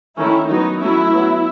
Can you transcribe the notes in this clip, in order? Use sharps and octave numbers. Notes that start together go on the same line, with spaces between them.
D#3 A3 C#4 E4
D#3 F#3 B3 D#4
F#3 A3 C#4 E4
F#3 B3